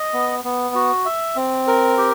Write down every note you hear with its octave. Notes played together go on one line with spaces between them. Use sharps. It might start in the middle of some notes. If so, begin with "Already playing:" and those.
Already playing: D#5
B3
B3
F#4
E5
C4
A#4
G4